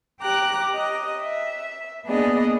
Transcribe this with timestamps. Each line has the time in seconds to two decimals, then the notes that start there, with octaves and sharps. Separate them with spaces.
0.20 G4 G5 A#5 D6 F#6
0.74 D#5
1.21 E5
2.05 A#3 B3 D4 G#4 D5 D#5